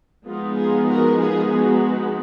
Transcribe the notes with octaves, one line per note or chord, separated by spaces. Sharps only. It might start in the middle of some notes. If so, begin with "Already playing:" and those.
F3 G#3 B3 D#4 F4
F4 G#4
F#4 A#4
F4 G#4
D#4 F#4